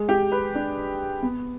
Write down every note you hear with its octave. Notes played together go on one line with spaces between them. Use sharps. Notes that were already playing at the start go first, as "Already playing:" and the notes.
Already playing: G#3
G4
B4
D4
B3